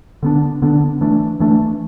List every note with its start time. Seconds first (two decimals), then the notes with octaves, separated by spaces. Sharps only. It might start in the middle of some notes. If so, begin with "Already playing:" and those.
0.23 D3 B3 D4
0.62 D3 B3 D4
1.01 E3 A3 D4
1.40 E3 A3 D4